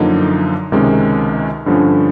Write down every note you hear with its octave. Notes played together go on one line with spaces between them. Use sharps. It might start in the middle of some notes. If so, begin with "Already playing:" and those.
Already playing: F#2 D3 F3 A#3 D#4
C#2 C3 D#3 G#3 C#4
G2 D3 F3 A3 C#4